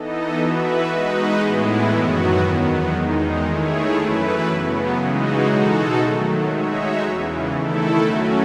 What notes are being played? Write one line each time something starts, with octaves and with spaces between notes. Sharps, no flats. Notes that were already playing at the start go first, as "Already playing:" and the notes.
Already playing: E3 B3 D#4 A4 D#5
E3 B3 F#4 B4 E5
G#3 D#4 F#4 B4 D#5
A2 E3 G#3 B3 E4
F#2 D#3 F#3 B3 F#4
E2 D#3 F#3 B3
E2 D#3 G#3 D#4
D#3 A3 E4 G#4 C#5
F#2 E3 A3 E4 B4
C#3 F#3 B3
C#3 E3 G#3 D#4 F#4
B2 G#3 D#4 F#4 A4
D#3 F#3 A3
G#3 D#4 F#4 C#5 E5
E2 C#3 E3
D#3 A3 E4 A4
F#3 A3 C#4 F#4